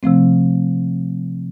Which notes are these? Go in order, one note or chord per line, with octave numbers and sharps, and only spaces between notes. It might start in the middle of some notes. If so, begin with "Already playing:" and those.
C3 F3 A3 C4